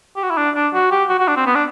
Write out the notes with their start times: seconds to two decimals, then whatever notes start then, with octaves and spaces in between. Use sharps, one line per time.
0.16 G4
0.23 F#4
0.30 E4
0.37 D4
0.55 D4
0.74 F#4
0.91 G4
1.09 F#4
1.19 F#4
1.28 D4
1.36 C4
1.46 B3
1.55 D4